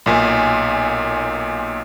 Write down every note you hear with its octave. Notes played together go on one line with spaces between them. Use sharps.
B1 A#2 G#5